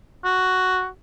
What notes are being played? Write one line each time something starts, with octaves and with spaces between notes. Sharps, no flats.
F#4